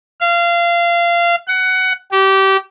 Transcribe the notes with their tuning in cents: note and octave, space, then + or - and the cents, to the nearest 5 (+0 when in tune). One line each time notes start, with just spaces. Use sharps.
F5 -25
F#5 +15
G4 -25